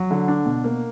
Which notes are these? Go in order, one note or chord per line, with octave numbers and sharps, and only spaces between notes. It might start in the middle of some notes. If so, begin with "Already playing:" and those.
Already playing: F#3
D3
D4
B2
A#3